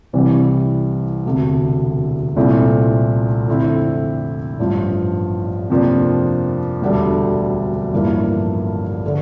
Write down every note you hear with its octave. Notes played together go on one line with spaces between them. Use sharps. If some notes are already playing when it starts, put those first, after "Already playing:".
C2 C3 E3 G3 C4
E1 D2 C3
C2 A#2 A3 C4 E4
F2 D3 A3 C4 E4
A1 G2 F3
F2 C3 F3 A#3 D4
E1 D2 D3 G3
A1 G2 F3 A#3 E4
D3